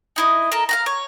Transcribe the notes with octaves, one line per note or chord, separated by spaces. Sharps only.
D#4 E4 D#5
A4 A#4
F5 F#5 A#5
C#5